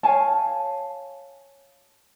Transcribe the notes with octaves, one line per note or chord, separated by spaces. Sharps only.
C#5 F5 G#5 A5